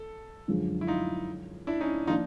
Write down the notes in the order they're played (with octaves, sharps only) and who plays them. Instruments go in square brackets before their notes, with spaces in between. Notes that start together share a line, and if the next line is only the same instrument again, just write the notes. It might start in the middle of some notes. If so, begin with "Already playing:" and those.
Already playing: [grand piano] A4
[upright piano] F#2 D3 F3 G#3
[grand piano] E4
D#4 F4
D4 E4
C#4 D#4
[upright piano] F3 A#3 D4 [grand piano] D#4 F4